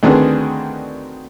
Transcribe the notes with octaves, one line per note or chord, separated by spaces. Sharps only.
D2 D#3 C4 D4 G#4 B4